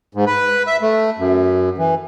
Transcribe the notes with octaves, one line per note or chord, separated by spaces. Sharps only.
G#2
B4
E5
A3
F#2
E3